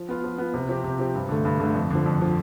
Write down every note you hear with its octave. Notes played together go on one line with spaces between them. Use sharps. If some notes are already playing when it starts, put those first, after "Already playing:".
Already playing: F3
B3 F4
F3
B3 F4
C3
F3 C4 G4
C3
F3 C4 G4
G2
D3 A3
G2
D3 A3
F2
D3 F3
F2
D3 F3